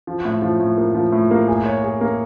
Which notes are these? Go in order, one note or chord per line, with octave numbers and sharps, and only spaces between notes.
F3
A2
F3
A2
A#3
F3
A2
A#3
G#4
C#5
G#4
A#3